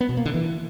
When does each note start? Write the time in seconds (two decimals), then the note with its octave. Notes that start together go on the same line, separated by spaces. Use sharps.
0.01 B3
0.09 B2
0.17 A#3
0.26 D3
0.34 E3